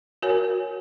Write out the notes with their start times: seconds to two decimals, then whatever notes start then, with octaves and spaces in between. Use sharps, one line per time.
0.22 F#4 A#4 C#5 G#5